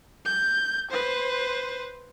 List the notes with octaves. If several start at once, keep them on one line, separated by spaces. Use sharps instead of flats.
G6
B4 C5